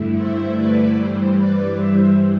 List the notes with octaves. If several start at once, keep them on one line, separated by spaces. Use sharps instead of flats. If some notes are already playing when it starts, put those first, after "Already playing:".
Already playing: G2 D3 A3 E4
C5 E5
B4 D5
G2 E3 G3 C5
B4 D5
C5 E5